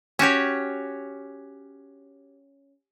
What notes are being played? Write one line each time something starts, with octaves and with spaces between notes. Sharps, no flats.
C#4 F#4 G4 C#5